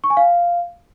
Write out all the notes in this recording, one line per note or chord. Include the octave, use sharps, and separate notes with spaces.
C#6
G#5
F5